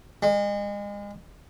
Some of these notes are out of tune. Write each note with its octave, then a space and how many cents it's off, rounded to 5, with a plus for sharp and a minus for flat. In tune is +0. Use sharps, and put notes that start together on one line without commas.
G#3 -35